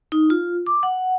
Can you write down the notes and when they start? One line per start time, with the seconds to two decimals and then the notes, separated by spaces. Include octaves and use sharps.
0.12 D#4
0.30 F4
0.67 D6
0.83 F#5